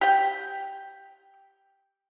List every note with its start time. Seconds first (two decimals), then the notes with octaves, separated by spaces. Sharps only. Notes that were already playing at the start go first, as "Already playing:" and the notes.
0.01 G4 G5